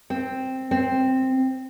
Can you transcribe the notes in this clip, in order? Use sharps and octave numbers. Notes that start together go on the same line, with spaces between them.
C4
C4